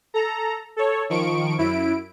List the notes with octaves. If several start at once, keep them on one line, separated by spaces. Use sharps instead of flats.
A4 A#5
A4 C#5
D#3 F3 C#6 D7
F#2 E4 D7